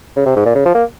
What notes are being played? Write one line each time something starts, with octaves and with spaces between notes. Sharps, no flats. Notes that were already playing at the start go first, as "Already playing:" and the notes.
C#3
C3
G#2
A#2
C#3
F3
A#3